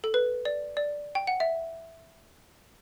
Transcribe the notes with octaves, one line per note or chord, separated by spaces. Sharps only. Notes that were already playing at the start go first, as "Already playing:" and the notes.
A4
B4
D5
D5
G5
F#5
E5